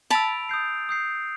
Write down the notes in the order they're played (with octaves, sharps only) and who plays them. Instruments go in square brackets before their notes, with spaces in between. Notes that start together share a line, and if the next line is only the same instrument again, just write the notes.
[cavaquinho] A5 B5 [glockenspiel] E6 A6 D7 F7
[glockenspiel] D#6 G6 C7
D#6 G6 C7